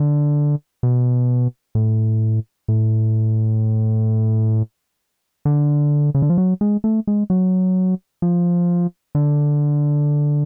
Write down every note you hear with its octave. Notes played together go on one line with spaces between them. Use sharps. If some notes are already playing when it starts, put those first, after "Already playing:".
Already playing: D3
B2
A2
A2
D3
C#3
D3
F3
F#3
G#3
A3
G#3
F#3
F3
D3